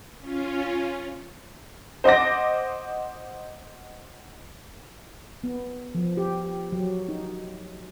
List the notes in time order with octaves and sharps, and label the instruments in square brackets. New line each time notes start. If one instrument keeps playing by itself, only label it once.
[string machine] C#4 F4
[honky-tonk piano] C5 D#5 F#5 D6 A#6
[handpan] B3
F3
G4
F#3
D#4